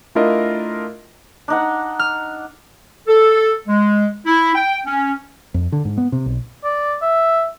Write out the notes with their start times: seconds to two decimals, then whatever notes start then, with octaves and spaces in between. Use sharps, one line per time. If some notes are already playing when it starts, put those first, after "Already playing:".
0.15 A3 D4 E4 F4 A#4 D#5
1.48 D4 D#4 F#5
1.99 F6
3.08 A4
3.68 G#3
4.26 E4
4.55 G5
4.86 C#4
5.54 F2
5.72 D3
5.85 G#2
5.97 B3
6.12 C3
6.26 B1
6.64 D5
7.02 E5